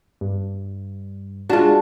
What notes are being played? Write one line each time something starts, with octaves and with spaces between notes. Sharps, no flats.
G2
G#3 D4 F4 F#4